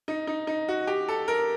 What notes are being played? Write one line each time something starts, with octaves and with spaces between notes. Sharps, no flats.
D#4
D#4
D#4
F#4
G4
A4
A#4